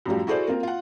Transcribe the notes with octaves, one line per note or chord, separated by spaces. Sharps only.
F#2 A2 F3 G3
E4 F#4 G#4 A4 C5 D5
A#3 C4 F4 A#4
F4 F#5